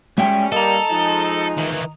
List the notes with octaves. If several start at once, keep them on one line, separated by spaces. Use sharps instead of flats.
G3 G#3 C#4 E5 G5
G3 A#3 A4 D#5 A#5
F3 G#3 D#4
D#3 E3